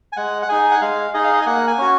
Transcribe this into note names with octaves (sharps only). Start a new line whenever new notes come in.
G#5
G#3 F#5
F#5
D#4 G#4 G#5
F#5
G#3 F5
D#4 G#4 D#5
F5
D#5
G#5
A#3 F#5
G#5
C#4 F#4